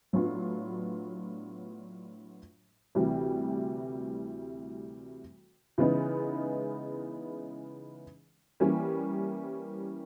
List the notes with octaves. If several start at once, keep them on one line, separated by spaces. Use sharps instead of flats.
A2 F#3 B3 D4 F4
D2 C3 E3 G3
C#3 E3 G#3 B3 D#4
E3 G3 A#3 C#4